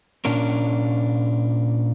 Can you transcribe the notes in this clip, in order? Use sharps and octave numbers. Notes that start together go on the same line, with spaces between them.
A#2 C#4 D4 A#4